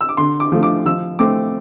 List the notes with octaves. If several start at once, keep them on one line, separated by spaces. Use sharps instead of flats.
E6
D6
D3 C6
D6
F3 A3
D6
F3 E6
A3 C4 D6